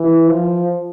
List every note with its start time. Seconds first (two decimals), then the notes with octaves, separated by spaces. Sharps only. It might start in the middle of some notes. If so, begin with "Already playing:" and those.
Already playing: E3
0.28 F3